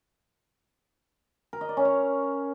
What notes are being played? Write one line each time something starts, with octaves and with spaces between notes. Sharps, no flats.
A#4
D#5
D5
C#4
C#5